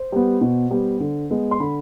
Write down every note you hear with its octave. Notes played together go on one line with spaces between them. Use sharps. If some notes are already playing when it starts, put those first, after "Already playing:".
Already playing: C5
G3 B3
B2
G3 B3
D3
G#3 B3
C6
D3 B5